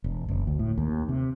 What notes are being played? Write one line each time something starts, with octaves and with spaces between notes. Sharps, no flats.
E1
F#1
D2
A2
D#2
C3